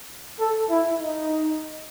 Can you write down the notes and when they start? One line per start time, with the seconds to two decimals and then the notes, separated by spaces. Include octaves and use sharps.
0.40 A4
0.70 E4
1.00 D#4